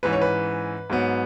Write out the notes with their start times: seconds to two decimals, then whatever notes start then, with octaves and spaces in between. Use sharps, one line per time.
0.03 G#2 E3 C#4 B4
0.13 C#5
0.21 B4
0.90 G#2 F#3 B3